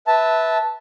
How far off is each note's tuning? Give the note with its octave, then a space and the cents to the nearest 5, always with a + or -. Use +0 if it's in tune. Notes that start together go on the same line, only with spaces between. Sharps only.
B4 +0 E5 -15 A5 +0